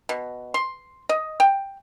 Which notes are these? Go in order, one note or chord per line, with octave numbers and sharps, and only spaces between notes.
B2
C6
D#5
G5